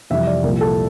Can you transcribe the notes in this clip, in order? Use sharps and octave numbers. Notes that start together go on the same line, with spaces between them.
F2 C3 E3 G3 E5
D5
C2 A#2 F3 A#4
A4